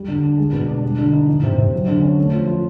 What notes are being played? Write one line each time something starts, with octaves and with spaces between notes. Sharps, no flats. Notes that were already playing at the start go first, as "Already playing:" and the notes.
Already playing: G3
D3
D4
G#3
B2
D4
G3
D3
D#4
E3
C3
C3
F#3
D3
C#4
A3
F3
F4